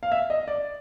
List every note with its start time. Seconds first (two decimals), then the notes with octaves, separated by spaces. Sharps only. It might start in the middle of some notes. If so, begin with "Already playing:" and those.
0.03 F5
0.12 E5
0.30 D#5
0.48 D5